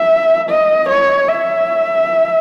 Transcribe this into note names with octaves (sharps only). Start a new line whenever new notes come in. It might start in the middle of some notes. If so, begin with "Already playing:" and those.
Already playing: E5
D#5
C#5
E5